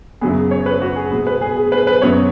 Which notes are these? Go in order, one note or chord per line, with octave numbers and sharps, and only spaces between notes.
F#2 C#3 F#3 B3 G#4
C#5
B4
F#4
G#4
B2 B3
B4
G#4
G#4
B4
B4
F#2 F#3 B3 C#5